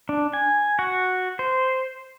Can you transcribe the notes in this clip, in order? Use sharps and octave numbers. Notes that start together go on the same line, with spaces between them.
D4
G#5
F#4
C5